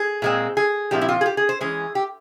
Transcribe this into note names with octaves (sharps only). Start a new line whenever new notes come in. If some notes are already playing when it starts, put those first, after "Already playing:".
Already playing: G#4
A#2 G#3 C4
G#4
A#2 F3 C4 E4 G4
E4
F4
G#4
G4
G#4
C5
E3 G#3 C#4 G#4
G4